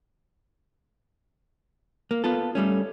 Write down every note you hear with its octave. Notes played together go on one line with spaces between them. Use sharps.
A#3
B3 F4 A4
G3 A3 C#4